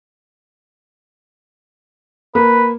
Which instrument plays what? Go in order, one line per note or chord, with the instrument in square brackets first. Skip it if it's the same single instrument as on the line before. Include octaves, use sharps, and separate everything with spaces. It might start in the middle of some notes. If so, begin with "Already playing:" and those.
[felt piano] A#3 [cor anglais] B4